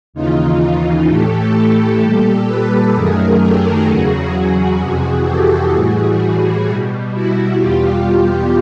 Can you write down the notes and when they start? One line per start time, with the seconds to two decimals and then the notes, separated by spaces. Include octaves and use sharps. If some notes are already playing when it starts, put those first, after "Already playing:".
0.14 D#2 C#3 E3 D#4 F4
1.07 A2 E3 A3 G4 A4
1.53 G4 A4
2.01 A#2 G3
2.47 A4 B4
2.93 F#2 D#3 F#3 A3 G#4 A#4
3.40 G4 A4
3.87 E2 C#3 F#3 F#4 G#4
4.33 F#4 G#4
4.80 F2 C3 E3
5.26 G4 A4
5.73 A2 E3 G3 F#4 G#4
6.67 B2 G3
7.13 E4 F#4
7.59 E2 B2 G3 F4 G4